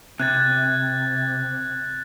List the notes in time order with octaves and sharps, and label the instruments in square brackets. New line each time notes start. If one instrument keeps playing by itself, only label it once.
[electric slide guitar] C3 [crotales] F#6 G#6 A6